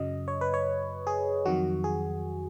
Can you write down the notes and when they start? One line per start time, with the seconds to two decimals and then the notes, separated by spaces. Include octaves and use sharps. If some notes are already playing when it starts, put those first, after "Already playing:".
Already playing: F#2 C#3 F#3 D#5
0.28 C#5
0.41 B4
0.54 C#5
1.07 G#4
1.45 F2 D#3 F#3 F#4
1.84 G#4